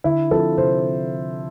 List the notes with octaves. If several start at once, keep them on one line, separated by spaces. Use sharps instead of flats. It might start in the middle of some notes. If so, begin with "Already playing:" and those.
D3 E4
F3 C4 F4 A4
C3 C5